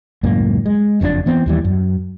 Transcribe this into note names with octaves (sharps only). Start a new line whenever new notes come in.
C#2 F#2 A2 A#3
G#3
F#1 F2 A#2 D4
E3 B3 C4
D#2 E3 G3
F#2